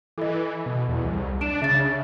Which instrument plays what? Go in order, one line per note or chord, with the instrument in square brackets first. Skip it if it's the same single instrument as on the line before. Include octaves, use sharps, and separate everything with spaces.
[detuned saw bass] E3 [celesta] A4 D#5
[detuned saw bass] B2
E2
C2
[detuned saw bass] D4 [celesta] D7 E7
[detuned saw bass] C#3 [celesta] E5 A6